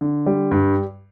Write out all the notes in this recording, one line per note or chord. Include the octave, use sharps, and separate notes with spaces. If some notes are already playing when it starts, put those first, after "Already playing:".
D3
G3
G2